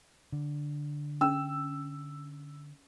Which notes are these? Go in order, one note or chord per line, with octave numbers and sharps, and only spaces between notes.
D3
C#4 E6